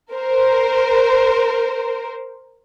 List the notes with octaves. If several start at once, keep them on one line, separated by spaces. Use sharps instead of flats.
A#4 C5